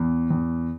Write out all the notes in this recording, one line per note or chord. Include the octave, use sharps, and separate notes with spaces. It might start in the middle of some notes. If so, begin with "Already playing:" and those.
Already playing: E2
E2